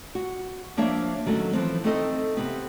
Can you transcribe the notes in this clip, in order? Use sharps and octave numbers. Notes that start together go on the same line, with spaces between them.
F#4
F3 A#3 D4 C#5 E5
D#3 F#3 A3 C#4
E3 F3 C4
A3 C4 D#4 A4 C5 D#5
C3 B3